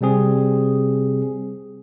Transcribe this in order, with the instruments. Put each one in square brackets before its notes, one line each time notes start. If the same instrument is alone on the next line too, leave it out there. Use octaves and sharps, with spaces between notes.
[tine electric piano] C3 G3 C4 G#4